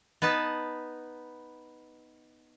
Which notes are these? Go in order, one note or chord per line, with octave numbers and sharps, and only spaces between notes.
B3 D#4 B4 A5